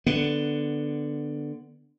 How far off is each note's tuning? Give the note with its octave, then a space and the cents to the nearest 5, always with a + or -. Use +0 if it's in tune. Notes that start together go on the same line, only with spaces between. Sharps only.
D3 +5 B3 +0